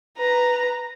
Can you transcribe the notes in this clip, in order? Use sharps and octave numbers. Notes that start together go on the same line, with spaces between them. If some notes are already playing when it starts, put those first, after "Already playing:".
B4 A#5